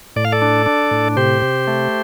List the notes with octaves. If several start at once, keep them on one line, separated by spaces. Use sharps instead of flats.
A2 D5
F5
A4 D5
D4
D4
A2
C3 G4 C5
C3
A3